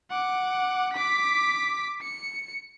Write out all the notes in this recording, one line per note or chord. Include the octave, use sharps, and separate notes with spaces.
F#5 D6
D6 B6
C#7